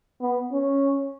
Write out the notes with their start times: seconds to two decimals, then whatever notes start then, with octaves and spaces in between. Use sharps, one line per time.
0.21 B3
0.53 C#4